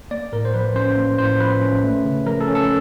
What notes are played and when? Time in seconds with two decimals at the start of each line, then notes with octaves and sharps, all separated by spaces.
0.11 A#3 D5
0.32 A2 A#4
0.45 C5
0.54 F3 B4
0.76 C#4 C5
0.97 A#3
1.19 A2 C5
1.40 F3 B4
1.61 C#4
1.83 A3
2.05 C#3
2.26 F3 A#4
2.41 A4
2.48 C#4
2.55 A4